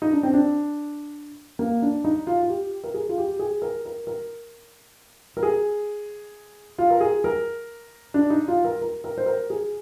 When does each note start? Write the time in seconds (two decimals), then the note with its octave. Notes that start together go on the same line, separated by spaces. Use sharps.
0.02 D#4
0.12 D4
0.23 C4
0.33 D4
1.59 A#3
1.82 D4
2.04 D#4
2.27 F4
2.43 F4
2.49 G4
2.84 A#4
2.94 G#4
3.09 F4
3.18 G4
3.39 G#4
3.62 A#4
3.86 A#4
4.07 A#4
5.37 A#4
5.43 G#4
6.79 F4
6.90 A#4
7.01 G#4
7.24 A#4
8.14 D4
8.30 D#4
8.48 F4
8.65 A#4
8.81 A#4
9.04 A#4
9.18 C5
9.26 A#4
9.50 G#4